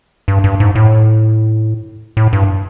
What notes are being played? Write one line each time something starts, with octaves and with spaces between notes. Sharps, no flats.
G2
G2
G#2
A2
A2
G2